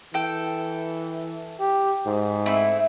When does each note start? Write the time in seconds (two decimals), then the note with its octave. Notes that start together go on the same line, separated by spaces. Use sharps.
0.14 E3 A4 G5
1.60 G4
2.06 G#2
2.46 A3 C4 E4